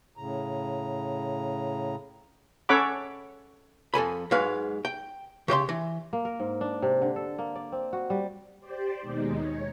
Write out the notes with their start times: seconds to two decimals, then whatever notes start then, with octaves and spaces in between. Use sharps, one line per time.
0.17 A2 C#3 A#5
2.69 C#4 A4 C#5 F#5 B5 D6
3.94 F2 A4 G#5 B5
4.31 G#2 F#3 G#3 B4 F5
4.85 G5
5.48 C#3 G4 D#5 C6
5.69 E3
6.13 A#3
6.25 A#4
6.40 G#2
6.61 D4
6.82 C3
7.02 D3
7.16 A4
7.39 A#3
7.56 D5
7.72 C4
7.93 F#4
8.10 G3
8.60 G4 C5 D5
9.00 D#2 B2 G#3 D#4
9.35 C#5